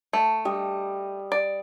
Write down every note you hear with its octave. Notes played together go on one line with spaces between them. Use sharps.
A3
G3 D#5
D5